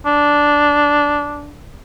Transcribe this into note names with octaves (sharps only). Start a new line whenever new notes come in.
D4